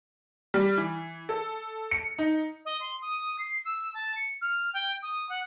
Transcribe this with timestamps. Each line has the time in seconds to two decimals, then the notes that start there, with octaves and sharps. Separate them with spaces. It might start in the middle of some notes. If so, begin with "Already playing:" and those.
0.54 G3
0.77 E3
1.29 A4
1.91 C#7
2.18 D#4
2.65 D#5
2.80 C6
3.02 D#6
3.39 C7
3.65 E6
3.94 A5
4.16 C#7
4.42 F6
4.74 G5
5.03 D#6
5.29 F#5